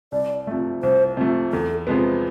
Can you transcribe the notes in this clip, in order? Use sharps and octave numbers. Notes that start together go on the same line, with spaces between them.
C2 D5
C3 F3 A3
C2 C5
C3 F3 A3
E2 A4
C3 F3 G#3 B3